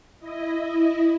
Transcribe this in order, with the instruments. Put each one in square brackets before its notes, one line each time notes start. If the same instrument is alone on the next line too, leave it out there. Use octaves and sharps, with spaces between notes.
[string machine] E4 D#5